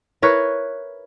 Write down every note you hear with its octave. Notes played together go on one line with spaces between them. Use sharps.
E4 A#4 B4 C#5